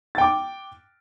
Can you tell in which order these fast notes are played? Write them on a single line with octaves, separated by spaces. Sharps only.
A6 G5 D6